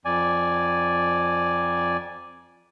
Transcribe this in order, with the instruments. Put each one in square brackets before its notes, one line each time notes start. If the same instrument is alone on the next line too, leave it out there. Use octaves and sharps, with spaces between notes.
[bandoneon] F2 D5 G#5